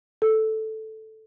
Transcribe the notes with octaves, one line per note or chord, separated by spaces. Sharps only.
A4